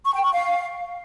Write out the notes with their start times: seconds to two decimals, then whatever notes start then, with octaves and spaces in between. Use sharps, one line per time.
0.04 C#6
0.14 G5
0.23 C#6
0.33 F5